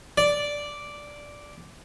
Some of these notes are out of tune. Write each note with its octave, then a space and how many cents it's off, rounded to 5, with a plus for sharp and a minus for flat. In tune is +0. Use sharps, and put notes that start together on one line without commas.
D5 -5